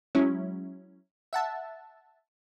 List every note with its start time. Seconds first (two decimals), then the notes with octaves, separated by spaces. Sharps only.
0.15 F#3 G#3 C#4 E4
1.33 E5 F#5 A5